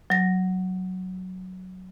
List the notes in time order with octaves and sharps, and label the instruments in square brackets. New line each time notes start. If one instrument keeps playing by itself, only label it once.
[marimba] F#3 A#6